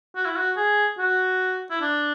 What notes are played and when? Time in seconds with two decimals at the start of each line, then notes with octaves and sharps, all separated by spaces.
0.16 F#4
0.26 E4
0.36 F#4
0.57 G#4
0.98 F#4
1.71 E4
1.81 D4